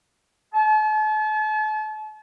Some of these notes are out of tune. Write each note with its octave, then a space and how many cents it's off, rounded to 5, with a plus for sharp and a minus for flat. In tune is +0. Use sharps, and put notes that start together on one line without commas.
A5 -40